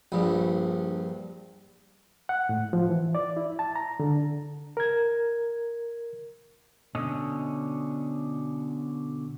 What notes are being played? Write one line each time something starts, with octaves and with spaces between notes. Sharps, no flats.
A#1 G2
F#5
A2
F3
E3
D5
E4
A5
A#5
D3
A#4 G#6
B2 D3 C#4 D#5